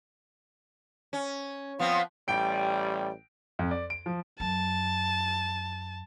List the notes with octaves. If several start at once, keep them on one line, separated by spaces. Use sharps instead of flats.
C#4
F3 B3 C4 F5
A1 G3 G5 D7
F2
D5
D7
F3
F#2 A5